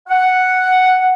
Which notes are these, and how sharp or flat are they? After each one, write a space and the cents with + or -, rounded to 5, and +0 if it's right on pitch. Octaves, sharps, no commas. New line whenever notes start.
F#5 +0